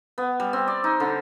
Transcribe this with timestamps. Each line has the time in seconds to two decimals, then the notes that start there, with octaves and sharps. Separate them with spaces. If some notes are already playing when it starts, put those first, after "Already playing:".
0.18 B3
0.40 G3
0.53 C4
0.68 D5
0.84 D#4
1.00 D3